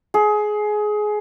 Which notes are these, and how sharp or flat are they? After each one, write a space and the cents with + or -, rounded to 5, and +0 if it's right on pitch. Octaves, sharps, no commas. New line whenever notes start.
G#4 +20